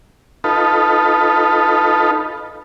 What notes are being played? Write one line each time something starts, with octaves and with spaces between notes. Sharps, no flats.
D#4 F4 A4 B4